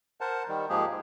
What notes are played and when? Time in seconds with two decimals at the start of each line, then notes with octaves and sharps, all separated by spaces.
0.21 A#4 C5 F#5 A5
0.48 D#3 G3
0.70 G#2 F3 G#3 A#3 G4 G#4
0.87 D2